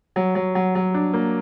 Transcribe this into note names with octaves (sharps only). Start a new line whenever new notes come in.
F#3
F#3
F#3
F#3
D4
A#3